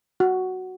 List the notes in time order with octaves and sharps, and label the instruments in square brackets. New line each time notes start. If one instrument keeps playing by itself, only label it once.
[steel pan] F#4